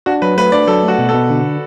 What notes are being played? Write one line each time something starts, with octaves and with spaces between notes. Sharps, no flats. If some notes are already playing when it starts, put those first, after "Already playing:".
D4 F#4
F#3 B4
A3 B4
D4 D5
F#3 A4
A3 F#4
B2
A4
B2
D3